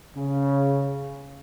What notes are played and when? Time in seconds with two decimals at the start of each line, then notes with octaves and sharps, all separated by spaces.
0.15 C#3